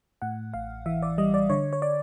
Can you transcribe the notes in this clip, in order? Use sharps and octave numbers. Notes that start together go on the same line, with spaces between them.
A2 F#5
A1 F5
E3 E5
D5
G3 D#5
D5
D3 C#5
C#5
D5